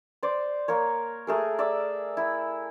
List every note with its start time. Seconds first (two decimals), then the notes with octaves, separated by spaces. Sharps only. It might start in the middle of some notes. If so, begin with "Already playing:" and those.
0.23 C5 D5
0.68 A#3 A#4 C#5
1.27 A3 G#4 A#4
1.59 D5 E5
2.17 E4